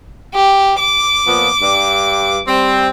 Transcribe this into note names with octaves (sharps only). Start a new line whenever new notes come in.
G4
D6
A#2 F3 B3
G2
G3 C4